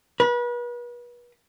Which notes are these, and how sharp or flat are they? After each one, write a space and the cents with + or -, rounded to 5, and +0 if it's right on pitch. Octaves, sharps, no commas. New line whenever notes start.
B4 -35